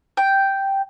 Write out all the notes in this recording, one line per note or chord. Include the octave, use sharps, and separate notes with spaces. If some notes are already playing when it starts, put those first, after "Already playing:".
G5